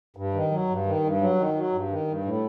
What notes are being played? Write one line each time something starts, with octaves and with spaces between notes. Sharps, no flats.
G2
D#3
F#3
G2
D#3
G2
F#3
D#3
F#3
G2
D#3
G2
A2